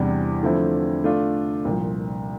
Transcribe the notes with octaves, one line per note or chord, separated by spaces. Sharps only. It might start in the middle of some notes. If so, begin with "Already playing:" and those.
Already playing: E2 C3 E3 G3 D4
D3 F3 A3 C4 E4
D3 A3 D4 F4
C2 A#2 F3